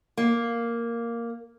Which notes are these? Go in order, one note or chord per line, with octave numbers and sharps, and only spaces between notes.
A#3